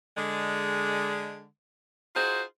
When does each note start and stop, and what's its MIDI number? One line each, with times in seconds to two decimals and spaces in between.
0.17 1.46 50
0.17 1.46 56
2.16 2.42 63
2.16 2.42 65
2.16 2.42 66
2.16 2.42 68
2.16 2.42 72